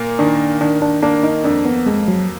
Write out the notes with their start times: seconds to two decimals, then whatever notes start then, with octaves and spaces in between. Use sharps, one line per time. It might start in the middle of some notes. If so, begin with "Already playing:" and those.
Already playing: A#2 A#3
0.19 D#3 D4
0.61 D#3 D4
0.82 D4
1.03 A#3 D4
1.23 D#4
1.44 F2 D4
1.65 B3
1.86 F2 G#3
2.08 F#3